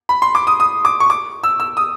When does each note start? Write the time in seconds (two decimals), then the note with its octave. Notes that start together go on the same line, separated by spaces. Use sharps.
0.09 B5
0.22 C6
0.35 D6
0.47 D#6
0.60 D#6
0.85 D6
1.00 C#6
1.10 D6
1.43 E6
1.60 E6
1.77 D#6